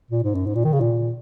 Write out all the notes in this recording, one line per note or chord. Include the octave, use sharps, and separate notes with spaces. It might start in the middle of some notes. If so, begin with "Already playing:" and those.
A#2
G#2
F#2
G#2
A#2
D#3
C#3
A#2